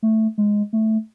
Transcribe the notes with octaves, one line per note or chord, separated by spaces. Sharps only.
A3
G#3
A3